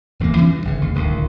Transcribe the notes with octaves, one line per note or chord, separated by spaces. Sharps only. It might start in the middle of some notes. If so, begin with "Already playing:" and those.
D1 E2 C3 A#3
E3 F3 C#4
G2
G1 C#3
D#2
D1 C#2 B2 D#3